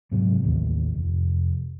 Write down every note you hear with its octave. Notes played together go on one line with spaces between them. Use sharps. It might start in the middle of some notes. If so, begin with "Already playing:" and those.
G#2 C3 F#3
A1 D#2
F1